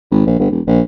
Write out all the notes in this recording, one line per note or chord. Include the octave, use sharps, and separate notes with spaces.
G#1
A#1
G1
E1
A#1